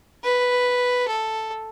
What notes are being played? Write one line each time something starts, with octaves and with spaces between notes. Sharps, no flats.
B4
A4